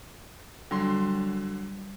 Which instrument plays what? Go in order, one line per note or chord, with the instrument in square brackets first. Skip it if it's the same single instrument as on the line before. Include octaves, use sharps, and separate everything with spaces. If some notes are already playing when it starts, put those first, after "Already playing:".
[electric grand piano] D3 F#3 C6 [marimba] G3